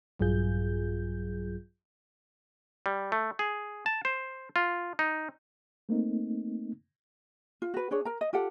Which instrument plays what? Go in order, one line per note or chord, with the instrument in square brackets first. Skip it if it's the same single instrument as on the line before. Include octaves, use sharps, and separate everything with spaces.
[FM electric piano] A#1 G2 F#3 F4 G#4 G6
[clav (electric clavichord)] G3
A3
G#4
A5
C5
F4
D#4
[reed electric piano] A3 A#3 C4 D#4
[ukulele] F4
F#4 B4
D4 G#4 C#5
A#4 A#5
D#5
F4 G4 A4 F#5